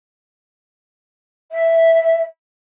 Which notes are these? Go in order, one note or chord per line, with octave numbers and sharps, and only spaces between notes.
E5